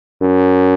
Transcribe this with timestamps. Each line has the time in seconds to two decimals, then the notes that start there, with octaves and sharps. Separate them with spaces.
0.22 F#2